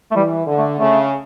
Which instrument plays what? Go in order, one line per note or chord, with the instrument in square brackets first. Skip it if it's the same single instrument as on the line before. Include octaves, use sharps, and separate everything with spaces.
[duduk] A3
[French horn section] E3 [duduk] G3
[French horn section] D3
[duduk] A3
[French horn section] C#3 [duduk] A3